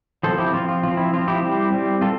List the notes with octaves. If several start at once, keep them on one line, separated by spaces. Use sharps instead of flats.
F3 C4 A4 C5
E4 G4
F3 C4 F4
F4
F3 C4 F4
E4
F3 C4 F4
E4 G4
G3 C4
G3 C4
C4 F4 A4